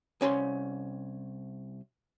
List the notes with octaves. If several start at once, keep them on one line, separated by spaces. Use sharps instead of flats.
C2 C#4 A#5 C6